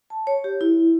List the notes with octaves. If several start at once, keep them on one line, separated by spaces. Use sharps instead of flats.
A5
C#5
G4
E4